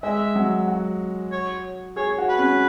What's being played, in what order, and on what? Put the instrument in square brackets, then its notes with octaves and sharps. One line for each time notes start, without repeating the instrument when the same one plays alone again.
[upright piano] G#3 [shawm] E5
[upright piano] F#3
F#4
[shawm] C#5
[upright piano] G#4 [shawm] C#5
[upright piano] F#4
[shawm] B4
[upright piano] C#4